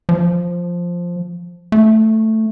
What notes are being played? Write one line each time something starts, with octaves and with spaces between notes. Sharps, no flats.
F3
A3